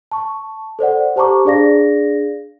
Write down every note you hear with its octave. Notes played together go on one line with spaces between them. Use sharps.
A5 C#6
A4 C5 D5 F#5
G4 C5 A5 A#5 C#6 D6
D4 G#4 D5 F5 A#6